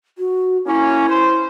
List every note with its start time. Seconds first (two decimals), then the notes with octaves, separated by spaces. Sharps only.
0.18 F#4
0.66 A#3 C#4 E4
1.09 C5